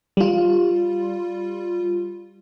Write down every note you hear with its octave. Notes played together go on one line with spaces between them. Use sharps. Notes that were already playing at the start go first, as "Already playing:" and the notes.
G3 F4